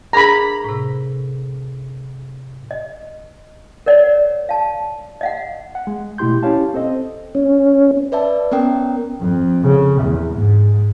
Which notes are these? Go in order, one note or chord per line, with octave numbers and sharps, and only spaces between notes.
D4 G#4 A#4 A#5 B5
A2 C3
D#5
A#4 C#5 D5 F#5
F5 A5
D#5 F5 F#5
F#5
G#3
B2 A3 E4 G4 C6 G6
C#4 E4 G4 C#5 F5 A5
C4 A4 C5 D#5
C#4
B4 D5 E5 A5
B3 C#4 A#4 G5
F2
C#3
E2
G#2